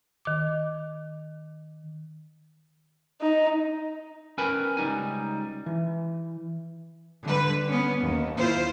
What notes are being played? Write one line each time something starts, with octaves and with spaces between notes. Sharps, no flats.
D#3 D6
D#4
C#4 A#4 B4 G5 G#5 B5
C#2 G3 D#4 G#5
E3
D3 G3 B4
B3 C#4
D#2
E4 F4 C5